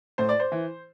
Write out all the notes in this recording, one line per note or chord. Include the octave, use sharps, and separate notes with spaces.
A2 C5
D5
C5
E3